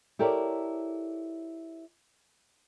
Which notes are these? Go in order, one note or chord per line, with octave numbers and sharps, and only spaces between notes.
E4 G4 A4 A#4 C#5 D5